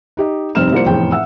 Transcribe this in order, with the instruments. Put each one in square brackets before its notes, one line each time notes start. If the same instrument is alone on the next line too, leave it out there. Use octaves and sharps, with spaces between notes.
[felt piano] D#4 G4 D#5
F1 G2 C4 D#4 F6 E7
C2 F3 A#3 C5 C#7
F1 E2 A2 G#4 C5 G5
E5 F#5 E6